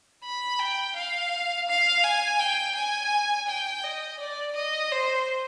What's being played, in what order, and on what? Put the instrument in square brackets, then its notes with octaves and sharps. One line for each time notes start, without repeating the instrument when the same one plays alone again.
[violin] B5
G5
F5
F5
G#5
G5
G#5
G5
D#5
D5
D#5
C5